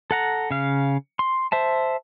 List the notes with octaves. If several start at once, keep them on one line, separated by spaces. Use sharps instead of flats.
A4 F#5 A#5
C#3 F5
C6
C5 E5 A5